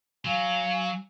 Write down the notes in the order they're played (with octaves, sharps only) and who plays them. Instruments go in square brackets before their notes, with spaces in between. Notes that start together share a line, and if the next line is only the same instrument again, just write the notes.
[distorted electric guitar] F#3 [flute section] F5 G#5